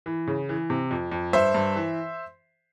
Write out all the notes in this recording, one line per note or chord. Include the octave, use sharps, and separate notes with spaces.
E3
C#3
E3
C3
F2
F2
G2 C5 E5
G2
E3